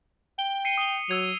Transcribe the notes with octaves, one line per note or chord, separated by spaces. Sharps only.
G5 G7
C7 C#7 D#7
D#6 G7
F#3 E6 G#6 F7